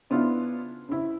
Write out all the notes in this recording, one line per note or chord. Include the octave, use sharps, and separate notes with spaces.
C#3 B3 D4 E4 F4
C#3 E4